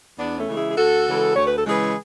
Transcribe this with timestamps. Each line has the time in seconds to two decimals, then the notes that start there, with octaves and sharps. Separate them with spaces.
0.19 E2 B3 D4
0.38 A3 C#4
0.48 C#3 E3 G#3
0.57 E4 G#4
0.71 G#4
0.77 D2 F#4 A4
1.07 C#3 E3 G#3
1.36 D2 C#5
1.47 B4
1.58 A4
1.65 C#3 E3 G#3 G#4 B4